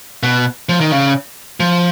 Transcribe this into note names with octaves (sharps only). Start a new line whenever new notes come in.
B2
F3
D#3
C#3
F3